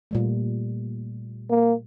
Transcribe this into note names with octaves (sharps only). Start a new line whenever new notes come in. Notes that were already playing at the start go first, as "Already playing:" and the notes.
A#2 G3 A3
A#3